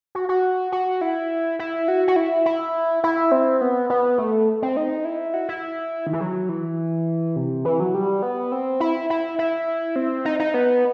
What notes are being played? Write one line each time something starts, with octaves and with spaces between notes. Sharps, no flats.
F#4
F#4
F#4
E4
E4
F#4
F#4
E4
E4
E4
C4
B3
B3
A3
C4
D#4
E4
F#4
E4
D#3
E3
F#3
E3
C3
E3
F#3
G3
B3
C4
E4
E4
E4
C4
D#4
D#4
B3